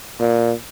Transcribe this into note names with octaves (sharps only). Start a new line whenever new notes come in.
A#2